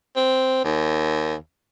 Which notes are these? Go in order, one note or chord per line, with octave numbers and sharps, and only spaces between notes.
C4
D#2